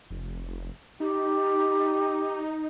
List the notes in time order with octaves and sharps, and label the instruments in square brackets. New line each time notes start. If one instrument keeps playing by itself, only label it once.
[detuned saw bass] F1
[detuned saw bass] D#4 [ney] G4